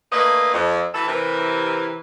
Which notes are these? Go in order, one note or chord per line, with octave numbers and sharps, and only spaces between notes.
A3 A#3 D4 B4 C#5 D#5
F2
D2 E3 A4 B4
C3 E3 A#4